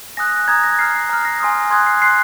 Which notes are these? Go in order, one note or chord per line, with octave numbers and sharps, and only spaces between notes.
G#5 D#6 F#6 A#6
A#6
A#5 D#6 F#6 G#6
A#6
A#5 F6 C7
A#5 F6 C7
A#6
G#5 C6 D#6
C6 D#6 F#6 G#6
C7
C6 F#6 C7